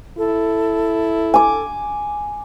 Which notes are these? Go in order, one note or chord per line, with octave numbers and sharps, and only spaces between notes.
E4 A4
G#5 D6